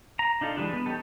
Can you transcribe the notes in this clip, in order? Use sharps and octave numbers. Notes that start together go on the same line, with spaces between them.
A#5
D4 D#4 F4 A4
E3 G3 G#3 D4
B3
C#4 D#4 G4 A4